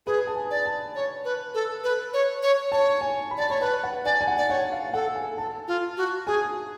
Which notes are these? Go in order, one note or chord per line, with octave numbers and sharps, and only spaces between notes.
G#4 B4
A5
G#5
D5
A5
C#5
B4
A4
B4
C#5
C#5
C#5 A5
G#5
B5
D5 A5
C#5 B5
B4 A5
F#5
D5 G#5
G#5
F#5
D5
C#5 F#5
F5
A4 F#5
G#5
A4 A5
F4
F#4
G#4 G#5